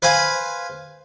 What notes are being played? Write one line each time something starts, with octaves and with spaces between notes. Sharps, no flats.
B4 C5 F5 G#5 B5